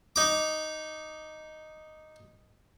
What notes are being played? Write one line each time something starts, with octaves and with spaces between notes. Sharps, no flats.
D#4 D6